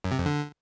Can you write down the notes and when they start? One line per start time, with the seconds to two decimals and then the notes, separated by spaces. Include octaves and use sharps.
0.04 F#2
0.12 C3
0.19 F2
0.26 D3